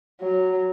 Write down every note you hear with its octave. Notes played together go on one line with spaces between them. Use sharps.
F#3